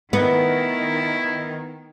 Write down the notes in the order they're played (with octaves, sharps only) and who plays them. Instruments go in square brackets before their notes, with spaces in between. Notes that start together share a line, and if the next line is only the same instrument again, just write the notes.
[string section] D#3 [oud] B3 [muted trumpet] E4